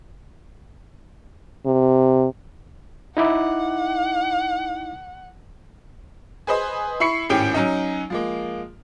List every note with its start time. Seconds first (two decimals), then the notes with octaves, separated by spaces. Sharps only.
1.66 C3
3.17 D#4 E4 F#5 D6
6.47 G#4 B4 C5 D#5
7.00 E4 B5 C#6 C7 C#7
7.29 G#1 A2 C#4 G4 D7
7.54 F#3 C#4 D#4
8.10 F3 G#3 A#3